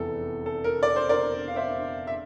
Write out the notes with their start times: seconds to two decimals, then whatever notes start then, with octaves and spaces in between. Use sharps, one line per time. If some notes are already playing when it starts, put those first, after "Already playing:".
Already playing: F1 E2 E3 A4
0.46 A4
0.64 A#4
0.83 D5
0.96 C5
1.09 A#4 D5
1.48 F5
1.56 C5 E5
2.07 E5